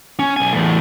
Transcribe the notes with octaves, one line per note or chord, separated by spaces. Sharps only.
C#4
B1 G#5
E2 A2